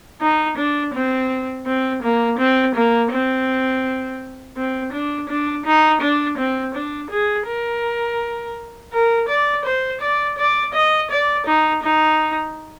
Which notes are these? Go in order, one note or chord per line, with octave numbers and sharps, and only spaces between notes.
D#4
D4
C4
C4
A#3
C4
A#3
C4
C4
D4
D4
D#4
D4
C4
D4
G#4
A#4
A#4
D5
C5
D5
D5
D#5
D5
D#4
D#4